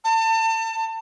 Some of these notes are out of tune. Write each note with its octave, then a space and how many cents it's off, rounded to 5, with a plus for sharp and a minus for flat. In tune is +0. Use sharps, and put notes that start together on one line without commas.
A5 +35